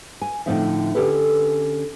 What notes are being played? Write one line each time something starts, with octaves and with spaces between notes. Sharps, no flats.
G#5
A2 D3 F3 C4 D#4 E5
D3 C#4 G4 A4 B4